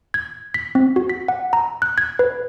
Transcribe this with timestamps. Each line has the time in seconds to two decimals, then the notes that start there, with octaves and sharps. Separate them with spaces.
0.14 G#6
0.54 B6
0.75 C4
0.96 F#4
1.10 B6
1.28 F#5
1.53 A#5
1.82 F#6
1.98 G#6
2.19 B4